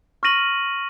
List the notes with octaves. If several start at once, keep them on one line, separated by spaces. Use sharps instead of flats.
C#6 F6 A#6 D#7 F#7